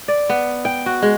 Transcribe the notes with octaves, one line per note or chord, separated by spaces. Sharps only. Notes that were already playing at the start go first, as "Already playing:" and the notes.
D5
B3
G5
F#4
G#3